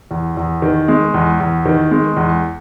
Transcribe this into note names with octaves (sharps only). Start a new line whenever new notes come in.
E2
E2
D#3
G#3
E2
E2
D#3
G#3
E2